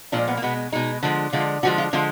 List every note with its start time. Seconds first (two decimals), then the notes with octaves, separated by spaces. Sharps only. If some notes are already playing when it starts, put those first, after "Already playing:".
0.12 A#2 F3 G#3 D4
0.28 B3
0.37 A#3
0.42 B2 G#3 B3
0.72 B2 G#3 D#4
1.03 D3 F3 G#3
1.33 D3 F3 G#3 F4
1.63 D3 F3 G#3 F#4
1.78 F4
1.93 D3 F3 G#3 F4